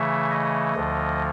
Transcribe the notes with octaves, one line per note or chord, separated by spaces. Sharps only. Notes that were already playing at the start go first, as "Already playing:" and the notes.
Already playing: C#3 E3 A3 E5
D#5
D2 D3 F3